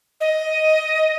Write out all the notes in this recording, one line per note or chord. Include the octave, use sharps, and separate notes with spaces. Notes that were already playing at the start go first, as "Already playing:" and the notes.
D#5